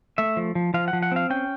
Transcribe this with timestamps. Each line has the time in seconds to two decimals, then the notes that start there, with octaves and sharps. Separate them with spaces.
0.18 A3 E5
0.37 F3
0.55 F3
0.74 F3 F5
0.88 F#5
0.93 F3
1.03 F#5
1.12 C4 F5
1.30 C#4 G5